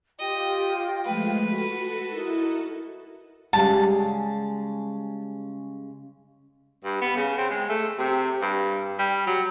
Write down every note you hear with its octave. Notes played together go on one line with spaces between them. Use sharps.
F4 G4 D#5 G5
F3 G#3 A3 B4
F#4 A4
D#4 E4 A#4
C#3 G3 G#3 A5
G2
B3
C#3
C4
G#3
A3
C3
G2
G3
F#3